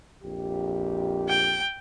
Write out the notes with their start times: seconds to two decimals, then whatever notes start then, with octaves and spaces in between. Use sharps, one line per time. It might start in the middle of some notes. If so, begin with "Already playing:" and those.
0.22 A#1 F2 G4
1.29 G5